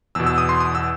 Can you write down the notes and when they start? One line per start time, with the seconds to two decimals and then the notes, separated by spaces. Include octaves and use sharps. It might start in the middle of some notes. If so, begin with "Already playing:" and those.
0.15 E2 B2 E6
0.26 E6
0.38 D#6
0.49 C6
0.60 D#6
0.75 E6